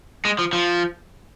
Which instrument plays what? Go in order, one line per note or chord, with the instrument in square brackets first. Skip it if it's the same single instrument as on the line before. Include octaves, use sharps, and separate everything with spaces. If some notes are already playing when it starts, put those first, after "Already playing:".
[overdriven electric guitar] G#3
F3
F3